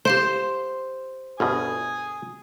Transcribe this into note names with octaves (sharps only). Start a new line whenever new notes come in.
G4 C5 F5 C6
G1 D2 B2 G#5 D#6